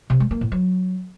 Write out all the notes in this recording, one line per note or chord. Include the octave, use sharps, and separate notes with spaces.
C3
G#3
A#3
A2
F#3